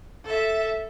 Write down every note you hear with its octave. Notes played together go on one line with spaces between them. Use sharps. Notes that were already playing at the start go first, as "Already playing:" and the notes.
A4 E5